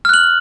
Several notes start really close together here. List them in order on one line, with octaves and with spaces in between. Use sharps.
F6 F#6 F#7